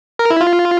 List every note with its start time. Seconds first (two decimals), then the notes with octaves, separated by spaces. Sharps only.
0.19 A#4
0.30 E4
0.41 F4